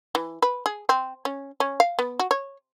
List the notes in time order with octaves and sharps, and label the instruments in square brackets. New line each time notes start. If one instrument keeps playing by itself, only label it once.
[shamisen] E3
B4
G#4
C4
C#4
C#4
F5
B3
F#4
C#5